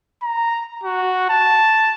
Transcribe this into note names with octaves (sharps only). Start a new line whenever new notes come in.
A#5
F#4
A5